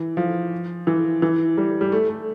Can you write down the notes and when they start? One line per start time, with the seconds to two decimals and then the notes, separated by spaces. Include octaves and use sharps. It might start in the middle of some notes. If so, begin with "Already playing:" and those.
Already playing: E3
0.17 F3
0.87 E3
1.22 E3
1.57 G3
1.81 G3
1.92 A3
2.09 A3